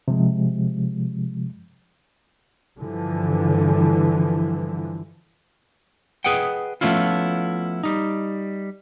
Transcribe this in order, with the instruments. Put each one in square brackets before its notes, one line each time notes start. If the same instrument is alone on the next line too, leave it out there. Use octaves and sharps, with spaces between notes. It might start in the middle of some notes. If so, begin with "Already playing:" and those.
[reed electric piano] C3 F3 G#3
[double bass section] G2 D3 E3 F3
[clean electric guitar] G#4 B4 D#5 F#5 G5
F3 A3 B3 C#4 E4 F4
G3 D#4